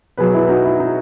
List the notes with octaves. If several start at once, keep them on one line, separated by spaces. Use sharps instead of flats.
B2 F#3 G#4 B4
E4
D#4 F#4
E4
D#4